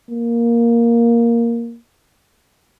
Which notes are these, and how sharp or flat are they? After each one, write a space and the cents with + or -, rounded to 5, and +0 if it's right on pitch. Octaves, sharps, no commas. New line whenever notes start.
A#3 +5